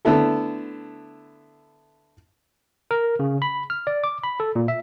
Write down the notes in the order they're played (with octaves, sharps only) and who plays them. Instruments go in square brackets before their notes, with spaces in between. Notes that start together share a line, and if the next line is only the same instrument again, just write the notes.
[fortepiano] D3 A3 B3 E4 A4
[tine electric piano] A#4
C#3
B5
F6
D5
D6
B5
A4
A#2
E5